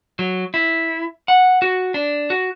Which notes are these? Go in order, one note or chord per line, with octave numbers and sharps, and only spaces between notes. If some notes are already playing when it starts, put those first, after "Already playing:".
F#3
E4
F#5
F#4
D4
F#4